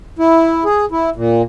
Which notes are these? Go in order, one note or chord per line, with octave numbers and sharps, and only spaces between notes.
E4
G#4
E4
A#2